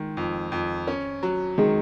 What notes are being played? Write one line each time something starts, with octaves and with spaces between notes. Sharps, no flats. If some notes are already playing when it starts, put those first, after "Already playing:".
Already playing: D#3 G#3
F2
F2
C#4
F#3
D#3 G#3